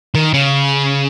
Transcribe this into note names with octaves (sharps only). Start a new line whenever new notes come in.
D#3
C#3